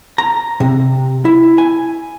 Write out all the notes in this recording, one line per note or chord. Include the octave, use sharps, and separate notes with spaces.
A#5
C3
E4
G#5